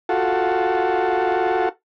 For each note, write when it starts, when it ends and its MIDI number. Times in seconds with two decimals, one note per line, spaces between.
0.09 1.69 65
0.09 1.69 66
0.09 1.69 69